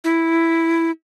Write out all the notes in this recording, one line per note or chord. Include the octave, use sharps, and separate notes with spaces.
E4